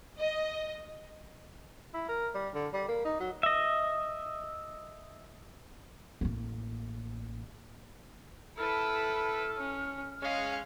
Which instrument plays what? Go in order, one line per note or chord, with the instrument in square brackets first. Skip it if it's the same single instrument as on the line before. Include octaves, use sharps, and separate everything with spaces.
[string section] D#5
[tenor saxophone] E4
A#4
G3
D3
G3
A#3
D#4
F#3
[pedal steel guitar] D#5 E5
[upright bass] A1 A#3
[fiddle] E4 B4 [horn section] A4 [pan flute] F6
[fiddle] C#4
[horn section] G#3 C#4 [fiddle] F5